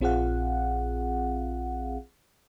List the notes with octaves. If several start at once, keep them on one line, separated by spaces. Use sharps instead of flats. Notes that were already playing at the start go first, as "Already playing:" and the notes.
A#1 C4 F4 G#4 F5 F#5